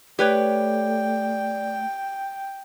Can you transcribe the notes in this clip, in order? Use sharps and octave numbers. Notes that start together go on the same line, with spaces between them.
A3 G4 B4 C#5 D5 G5